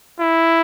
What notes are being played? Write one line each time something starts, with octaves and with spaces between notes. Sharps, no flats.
E4